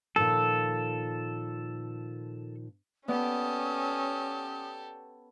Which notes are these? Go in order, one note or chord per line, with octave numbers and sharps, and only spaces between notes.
A#2 D#3 F3 A4
B3 C#4 G4 A4 D5 D#6